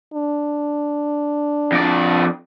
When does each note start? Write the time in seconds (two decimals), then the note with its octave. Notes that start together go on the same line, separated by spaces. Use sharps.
0.14 D4
1.72 F2 D5